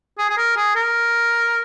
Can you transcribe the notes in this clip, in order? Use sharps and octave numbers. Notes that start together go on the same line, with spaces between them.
G#4
G#4
A#4
G#4
A#4